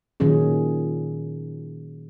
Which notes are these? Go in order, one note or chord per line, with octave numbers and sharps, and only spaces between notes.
A#2 D#3 F#3 C#4 G#4